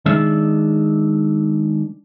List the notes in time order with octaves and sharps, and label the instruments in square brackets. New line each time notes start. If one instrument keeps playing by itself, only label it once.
[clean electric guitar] D#3 G#3 D4 E5